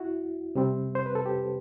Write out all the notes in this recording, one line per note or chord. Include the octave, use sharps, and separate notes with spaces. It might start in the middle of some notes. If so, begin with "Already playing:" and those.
Already playing: E4 F#4
C3 G3 C4
C5
B4
A4
G4